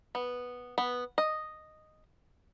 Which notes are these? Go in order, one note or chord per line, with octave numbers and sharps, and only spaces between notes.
B3
B3
D#5